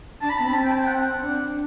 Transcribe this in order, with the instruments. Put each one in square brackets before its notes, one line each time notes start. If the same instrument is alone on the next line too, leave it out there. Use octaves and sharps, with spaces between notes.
[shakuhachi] D4 [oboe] A5
[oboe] B5
[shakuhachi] B3 [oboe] A5
[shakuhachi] C4 [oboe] B5
[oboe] A5
G5
A5
G5
F#5
[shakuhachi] D4